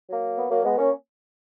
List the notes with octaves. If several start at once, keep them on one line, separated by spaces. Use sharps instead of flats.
F#3 A#3
B3
F#3 A#3
G#3 B3
A#3 C#4